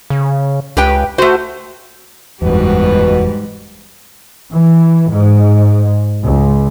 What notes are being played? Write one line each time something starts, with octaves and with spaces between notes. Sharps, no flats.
C#3
C#2 G4 B4 G5
A3 F#4 C5
F#1 E2 G#2 B2 G3 F#4 B4
E3
G#2
C#2